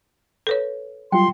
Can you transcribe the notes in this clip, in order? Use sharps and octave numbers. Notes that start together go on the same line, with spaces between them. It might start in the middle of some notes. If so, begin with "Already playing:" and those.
A4 B4 C#5
F#3 G3 F4 G5 C6